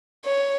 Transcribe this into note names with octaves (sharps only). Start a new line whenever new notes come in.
C#5